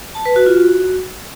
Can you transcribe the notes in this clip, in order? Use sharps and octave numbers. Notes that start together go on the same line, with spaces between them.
A5
B4
F#4
F4
F#4